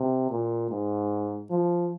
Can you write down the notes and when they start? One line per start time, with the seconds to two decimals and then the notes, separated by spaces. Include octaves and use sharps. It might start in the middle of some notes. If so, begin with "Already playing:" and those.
Already playing: C3
0.30 A#2
0.70 G#2
1.51 F3